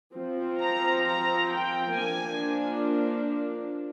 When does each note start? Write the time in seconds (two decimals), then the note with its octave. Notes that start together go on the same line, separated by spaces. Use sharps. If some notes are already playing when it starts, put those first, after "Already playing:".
0.15 F3 C4
0.60 A#5
1.05 A#5
1.50 G5
1.96 F3 A#3 D4 G#5